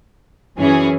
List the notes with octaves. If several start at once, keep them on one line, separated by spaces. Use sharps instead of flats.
F#2 E3 C#4 G#4